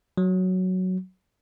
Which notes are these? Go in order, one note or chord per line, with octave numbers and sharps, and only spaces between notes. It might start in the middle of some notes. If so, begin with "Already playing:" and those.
F#3